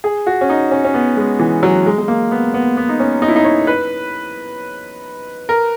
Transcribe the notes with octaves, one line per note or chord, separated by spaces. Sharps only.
G#4
F#4
C#4
D#4
C#4
C#4
B3
G#3
E3
F#3
G#3
G#3
A#3
B3
B3
B3
D#4
C#4
D#4
E4
D#4
C#5
B4
A#4